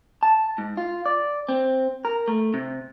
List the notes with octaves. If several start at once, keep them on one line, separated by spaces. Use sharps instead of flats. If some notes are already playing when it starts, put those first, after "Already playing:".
A5
G#2
F4
D5
C4
A#4
A3
C3